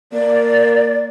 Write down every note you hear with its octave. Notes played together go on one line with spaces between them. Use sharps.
A#3 D5